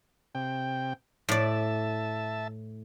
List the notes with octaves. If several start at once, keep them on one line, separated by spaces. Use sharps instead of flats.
C3 G5
A2 D5 E5 A5